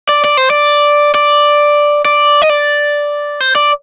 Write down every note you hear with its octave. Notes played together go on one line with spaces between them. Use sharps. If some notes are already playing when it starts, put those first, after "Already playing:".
D5
D5
C5
D5
D5
D5
D#5
D5
C5
D5